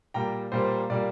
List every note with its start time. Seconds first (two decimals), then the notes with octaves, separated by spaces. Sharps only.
0.14 A#2 G3 A#3 G5 A#5
0.52 A#2 G3 A#3 C5
0.90 A#2 G3 A#3 D5